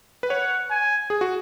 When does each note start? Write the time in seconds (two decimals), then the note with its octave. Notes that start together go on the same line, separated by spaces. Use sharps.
0.23 B4
0.30 C#5 F#5
0.70 G#5
1.10 G#4
1.21 F#4